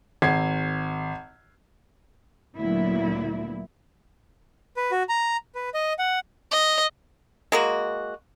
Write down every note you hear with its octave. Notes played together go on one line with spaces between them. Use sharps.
G#1 G#6 C7
D2 A#2 F#3 B3 E4
B4
F#4
A#5
B4
D#5
F#5
D#5
G#3 A#3 F#4